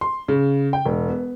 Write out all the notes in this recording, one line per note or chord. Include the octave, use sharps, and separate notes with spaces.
C6
C#3
G5
E1
B3